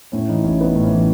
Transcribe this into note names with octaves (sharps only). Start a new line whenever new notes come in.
A2 C#4
E3 D#4
A1 C#4
B3 D#4
A2
C#4
E3